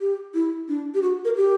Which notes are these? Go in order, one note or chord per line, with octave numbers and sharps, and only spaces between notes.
G4
E4
D4
G4
F#4
A#4
G4